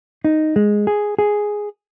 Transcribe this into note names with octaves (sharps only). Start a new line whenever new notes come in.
D#4
G#3
G#4
G#4